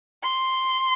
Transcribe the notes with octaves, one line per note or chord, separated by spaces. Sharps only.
C6